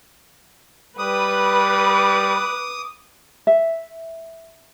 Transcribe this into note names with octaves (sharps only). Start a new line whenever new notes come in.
G3 B4 D6 D#6
E5